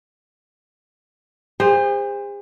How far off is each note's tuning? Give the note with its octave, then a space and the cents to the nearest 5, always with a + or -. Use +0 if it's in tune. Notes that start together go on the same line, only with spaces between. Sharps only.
G#4 -45 C5 +0